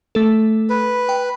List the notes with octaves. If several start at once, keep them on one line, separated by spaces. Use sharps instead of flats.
A3 A4
B4
G5